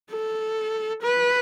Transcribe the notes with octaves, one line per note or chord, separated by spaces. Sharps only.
A4
B4